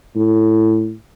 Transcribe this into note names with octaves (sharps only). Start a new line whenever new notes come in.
A2